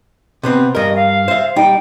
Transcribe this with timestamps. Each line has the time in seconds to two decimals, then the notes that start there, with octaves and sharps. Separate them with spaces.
0.43 C3 B3 C4
0.75 G2 A#4 D#5
0.95 F5
1.28 C5 E5
1.56 G3 D#4 G5